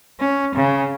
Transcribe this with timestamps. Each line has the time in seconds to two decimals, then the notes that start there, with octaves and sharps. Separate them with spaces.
0.20 C#4
0.55 C#3